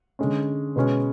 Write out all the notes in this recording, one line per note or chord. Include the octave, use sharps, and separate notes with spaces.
D3 G#3 C#4
B2 G#3 C#4